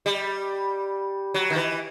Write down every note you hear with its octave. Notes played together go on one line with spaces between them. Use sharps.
G3
F#3
D#3
E3